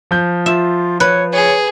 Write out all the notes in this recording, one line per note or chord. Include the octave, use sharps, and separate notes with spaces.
F3 G6
F4 E5
B4 C#5
G#4 C#5